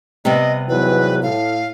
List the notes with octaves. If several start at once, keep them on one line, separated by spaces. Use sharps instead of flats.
C3 G3 B3 D#5
E2 G#2 F#3 B4
A2 F5